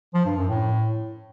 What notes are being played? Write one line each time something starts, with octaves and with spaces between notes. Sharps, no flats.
F3
G2
F#2
A2